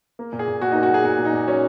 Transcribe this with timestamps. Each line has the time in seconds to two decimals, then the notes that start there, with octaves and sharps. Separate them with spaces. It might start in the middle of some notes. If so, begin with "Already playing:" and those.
0.19 A#3
0.33 A#2
0.39 G#4
0.48 A#2
0.61 A#2 F#4
0.72 D#4
0.75 A#3
0.83 F#4
0.91 F#3 G#4
1.04 A#2 F#4
1.18 A#2
1.25 D#4
1.33 A#2
1.47 F#3 C#4